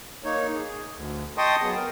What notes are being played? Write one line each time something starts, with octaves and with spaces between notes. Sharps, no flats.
A#3 D#4 C#5
G#4
D2
D#5 G5 A5 C6 C#6 D#6
F#3 B3 G#4
A#4